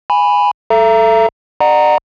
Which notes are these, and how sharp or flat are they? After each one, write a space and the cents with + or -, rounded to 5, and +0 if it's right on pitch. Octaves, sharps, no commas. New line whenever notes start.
G#5 -10 B5 +0
A4 +0 E5 +40 A#5 +0
D5 +45 F#5 +0 A#5 -5